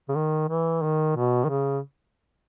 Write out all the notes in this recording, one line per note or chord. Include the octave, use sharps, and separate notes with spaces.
C#3
D#3
E3
D#3
B2
D#3
C#3